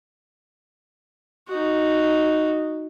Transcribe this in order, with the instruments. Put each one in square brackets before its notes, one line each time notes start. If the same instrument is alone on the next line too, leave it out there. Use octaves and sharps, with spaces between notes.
[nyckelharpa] D#4 F#4